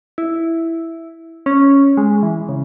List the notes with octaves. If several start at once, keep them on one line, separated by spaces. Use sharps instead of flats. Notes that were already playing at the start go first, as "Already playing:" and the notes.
E4
C#4
G#3
E3
C#3